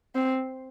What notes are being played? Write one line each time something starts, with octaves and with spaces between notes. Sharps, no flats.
C4